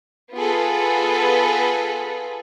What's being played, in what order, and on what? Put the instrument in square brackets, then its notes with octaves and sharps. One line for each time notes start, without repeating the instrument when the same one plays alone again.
[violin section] B3 F4 G#4 A4 B4